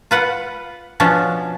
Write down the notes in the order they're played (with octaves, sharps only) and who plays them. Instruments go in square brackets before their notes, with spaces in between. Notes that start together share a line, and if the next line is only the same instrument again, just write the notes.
[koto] F4 B4 F#5
B2 F3 C#4 D4